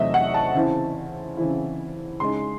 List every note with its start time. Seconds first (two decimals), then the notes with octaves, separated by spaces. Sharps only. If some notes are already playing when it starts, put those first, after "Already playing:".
Already playing: E2 C3 F#3 A3 C4 D#5 E5
0.14 F#5
0.34 A5
0.54 C#3 E3 C4 E4
1.37 C#3 E3 C4 E4
2.20 C#3 G#3 D#4 C6